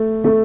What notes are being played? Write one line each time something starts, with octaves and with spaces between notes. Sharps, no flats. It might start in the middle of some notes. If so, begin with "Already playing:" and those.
Already playing: A3
A3